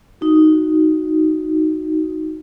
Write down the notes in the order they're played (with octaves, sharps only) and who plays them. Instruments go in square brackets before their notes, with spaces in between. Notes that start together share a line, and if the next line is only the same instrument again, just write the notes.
[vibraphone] D#4 F#4